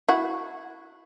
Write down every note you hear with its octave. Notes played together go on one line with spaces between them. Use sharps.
E4 F#4